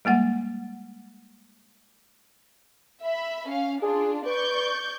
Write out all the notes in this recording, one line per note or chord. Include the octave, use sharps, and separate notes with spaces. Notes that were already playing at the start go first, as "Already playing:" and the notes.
G3 G#3 A#3 F#5
E5 B5
C#4 F5
D4 F4 G#4
B4 D5 C#6 G6